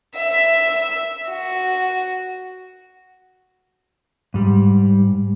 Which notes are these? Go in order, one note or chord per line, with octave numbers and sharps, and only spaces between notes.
E5
F#4
G#2 G3